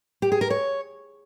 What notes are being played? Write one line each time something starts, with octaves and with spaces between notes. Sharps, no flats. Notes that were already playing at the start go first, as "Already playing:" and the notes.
G4
G#4
A#4
C#5